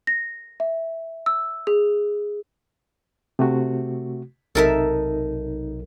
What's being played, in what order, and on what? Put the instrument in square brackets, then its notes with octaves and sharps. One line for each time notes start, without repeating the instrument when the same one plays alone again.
[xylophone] A#6
E5
E6
G#4
[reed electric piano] C3 A3 F#4
[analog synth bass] B1 [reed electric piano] C3 D#4 [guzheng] A4 A#4 E5